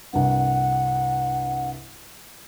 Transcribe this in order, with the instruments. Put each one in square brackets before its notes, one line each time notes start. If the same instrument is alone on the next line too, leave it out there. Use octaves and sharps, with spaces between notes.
[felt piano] C2 G2 [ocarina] F#5